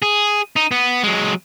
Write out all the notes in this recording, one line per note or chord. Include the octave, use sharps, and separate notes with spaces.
G#4
D#4
B3
F#3 G#3